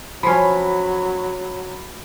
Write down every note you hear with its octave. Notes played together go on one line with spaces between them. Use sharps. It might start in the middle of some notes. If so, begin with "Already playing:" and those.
F3 F#3 C#4 B5